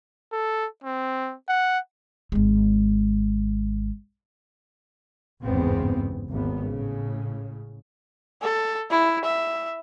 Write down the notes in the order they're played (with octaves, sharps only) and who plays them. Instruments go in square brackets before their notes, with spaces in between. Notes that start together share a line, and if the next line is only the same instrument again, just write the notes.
[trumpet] A4
C4
F#5
[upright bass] G#1 G#3
[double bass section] G#1 E2 G2 C#3 B3 C4
G#1 D#2 B3
A2 C#3
[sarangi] A4
E4
E5